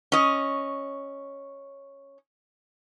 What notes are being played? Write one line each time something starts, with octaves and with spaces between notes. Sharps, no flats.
C#4 D#5